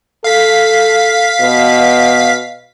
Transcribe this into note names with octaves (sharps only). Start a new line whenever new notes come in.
A4 F5 B6
B2